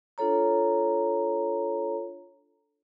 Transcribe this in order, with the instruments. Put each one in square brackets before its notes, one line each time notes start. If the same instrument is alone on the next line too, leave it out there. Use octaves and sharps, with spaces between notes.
[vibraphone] D4 F4 A4 C#5 A#5